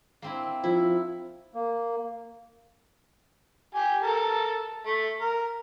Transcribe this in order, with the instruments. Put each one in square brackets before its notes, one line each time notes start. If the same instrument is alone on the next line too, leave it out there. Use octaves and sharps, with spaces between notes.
[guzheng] A#3 C4 E4
[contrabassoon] F3 [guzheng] E4
[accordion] A#3
[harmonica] G4 G#5
A4 A#4 A5
A3
A#4